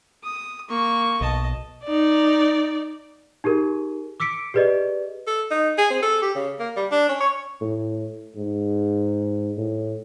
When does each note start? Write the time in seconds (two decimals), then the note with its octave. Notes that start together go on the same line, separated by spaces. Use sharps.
0.23 D#6
0.69 A#3 C#6
1.21 B1 D#5 A5
1.84 D#4 D5
3.44 D#4 G4 G#4 A#4
4.20 D6 E6 B6 C#7 D7
4.54 G4 G#4 B4 D5 D#5
5.27 A4
5.51 D#4
5.78 G#4
5.90 C4
6.03 A4
6.23 G4
6.35 C#3
6.60 A#3
6.76 G3
6.92 D4
7.09 C#4
7.21 C#5
7.61 A2
8.36 G#2
9.57 A2